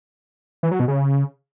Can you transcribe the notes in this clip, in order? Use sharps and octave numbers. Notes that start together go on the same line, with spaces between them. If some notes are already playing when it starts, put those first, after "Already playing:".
E3
F#3
B2
C#3